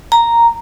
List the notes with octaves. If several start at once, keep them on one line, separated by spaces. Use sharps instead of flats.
A#5